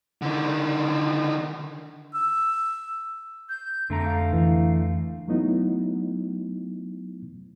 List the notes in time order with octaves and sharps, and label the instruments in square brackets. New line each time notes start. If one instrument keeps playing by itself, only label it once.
[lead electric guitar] D3 D#3
[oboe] E6
[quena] G6
[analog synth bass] F2 [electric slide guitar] D3 A3 A#5
[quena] F5
[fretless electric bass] E3
[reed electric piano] F#3 A3 B3 D#4 E4